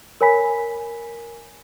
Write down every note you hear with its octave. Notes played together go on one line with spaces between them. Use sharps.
A#4 C#5 G#5 B5 B6